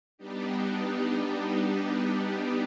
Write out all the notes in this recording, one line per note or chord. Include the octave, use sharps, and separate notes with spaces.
G3 B3 D4 D#4 G4